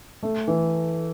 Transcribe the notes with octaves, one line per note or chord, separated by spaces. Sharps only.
A3
E3